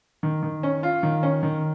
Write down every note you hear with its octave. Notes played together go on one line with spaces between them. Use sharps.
D#3
D#3
C#4
F4
D#3
C#4
D#3